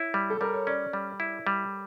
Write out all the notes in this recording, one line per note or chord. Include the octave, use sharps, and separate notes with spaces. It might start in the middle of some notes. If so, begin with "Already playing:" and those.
Already playing: E4 C#5
G3
A4
G3 A#4
C#5
C#4 D5
G3
E4
G3